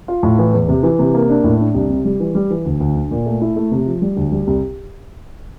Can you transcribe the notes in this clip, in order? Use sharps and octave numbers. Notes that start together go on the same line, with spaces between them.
F4
A2
E3
E2
C3
E3
C3
A#3
D4
A2
D4
C2
C3
G3
E3
G3
E3
D2
D2
D3
A#2
A3
E4
A3
C3
F3
G3
D2
G3
C2